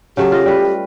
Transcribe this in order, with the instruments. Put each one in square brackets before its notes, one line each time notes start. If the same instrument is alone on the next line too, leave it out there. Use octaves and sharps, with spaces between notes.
[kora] C#3 F#3 A3 [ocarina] G4
[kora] F4 D#5
G3 B4